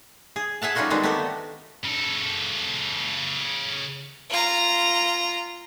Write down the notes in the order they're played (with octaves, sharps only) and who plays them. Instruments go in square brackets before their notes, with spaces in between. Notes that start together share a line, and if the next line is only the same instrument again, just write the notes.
[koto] G#4
G#4 E5 F#5 A5
G3 C#4 D#4 F4 F#4 A4
D3 D#3 G3 G#3 B3 C4
A3 B3 F#4 G4 A4
[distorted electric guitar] C#3 A4
[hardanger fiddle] F4 A#5